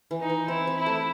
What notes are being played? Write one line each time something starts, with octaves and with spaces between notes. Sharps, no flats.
E3
D#4
E3
C4 E4
C4
E4
A3